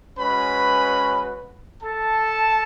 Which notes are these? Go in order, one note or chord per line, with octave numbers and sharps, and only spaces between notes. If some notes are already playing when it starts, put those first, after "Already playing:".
G#3 C#4 F#4 B4 B5
A4 A5